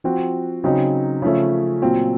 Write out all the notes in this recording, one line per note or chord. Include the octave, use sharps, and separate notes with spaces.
F3 C4 F#4
C#3 F#3 C4 D#4
C#3 F3 A3 C#4
A#2 F#3 C4 F4